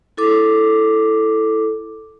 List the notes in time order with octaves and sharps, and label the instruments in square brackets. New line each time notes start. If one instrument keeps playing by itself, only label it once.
[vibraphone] E4 A4 D6